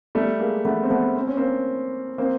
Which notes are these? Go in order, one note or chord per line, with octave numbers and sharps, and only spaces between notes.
G3 A3
G#3 A#3
A3 B3
C4
A3 B3
C4
C#4
A#3 C4
A#3 C4